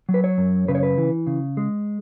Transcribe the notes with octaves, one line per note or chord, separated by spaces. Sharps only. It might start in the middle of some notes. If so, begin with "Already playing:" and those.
F#3
B4
C#5
F#2
C#3 B4
C#5
B4
E3
C#3
G#3